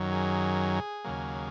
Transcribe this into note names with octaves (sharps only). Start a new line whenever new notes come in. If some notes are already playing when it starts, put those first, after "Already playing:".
Already playing: F#2 D#3 F#3
G#4
D#2 C#3 F#3 A#3